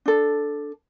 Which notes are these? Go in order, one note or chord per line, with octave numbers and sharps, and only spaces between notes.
D4 A4